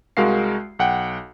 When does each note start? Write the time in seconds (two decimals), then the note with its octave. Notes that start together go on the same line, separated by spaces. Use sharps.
0.17 C2 G#3 F#4 A#4 F5 C7
0.79 B1 F#5 G5